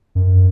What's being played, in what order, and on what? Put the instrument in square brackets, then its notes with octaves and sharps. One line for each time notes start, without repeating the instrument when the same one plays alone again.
[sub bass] F#2